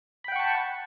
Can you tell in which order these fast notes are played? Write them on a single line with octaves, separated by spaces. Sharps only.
B5 G5 F#5 C#6 A5